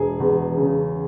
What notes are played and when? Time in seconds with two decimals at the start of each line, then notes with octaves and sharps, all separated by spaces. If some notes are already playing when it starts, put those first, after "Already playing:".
Already playing: E1 G#4
0.20 E2
0.57 C#3